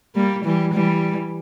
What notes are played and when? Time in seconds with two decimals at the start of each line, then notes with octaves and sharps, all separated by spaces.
0.15 G3 A#3
0.44 E3 G3
0.73 E3 G3